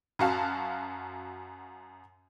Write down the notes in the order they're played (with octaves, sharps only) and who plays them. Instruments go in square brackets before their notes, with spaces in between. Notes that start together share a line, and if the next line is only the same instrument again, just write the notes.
[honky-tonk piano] F#2 F#4 F5 A5